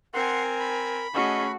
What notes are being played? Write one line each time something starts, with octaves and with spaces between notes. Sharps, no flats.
C4 A#4 F#5 G#5 C6
B5
A3 C#4 F#4 G#4 D#5